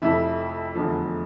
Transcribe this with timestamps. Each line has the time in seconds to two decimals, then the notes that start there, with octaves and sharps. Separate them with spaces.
0.02 F1 F2 C3 F3 E4 E5
0.75 F1 E2 D3 F3